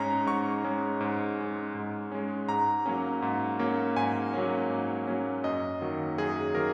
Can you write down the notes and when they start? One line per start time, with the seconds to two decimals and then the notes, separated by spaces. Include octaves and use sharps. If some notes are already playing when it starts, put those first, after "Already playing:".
Already playing: G#2 G#3 C#4 A#5
0.27 G#2 C#6
0.64 G#3 C#4
1.01 G#2
1.38 G#3 C#4
1.75 G#2
2.12 G#3 C#4
2.49 G#2 A#5
2.86 F#3 A#3 C#4
3.22 G#2
3.59 F#3 A#3 C#4
3.96 G#2 G#5
4.33 F#3 A#3 C#4
4.70 G#2
5.07 F#3 A#3 C#4
5.44 F#2 D#5
5.81 D#3 F#3 A#3
6.18 F#2 G#4
6.55 D#3 F#3 A#3 A#4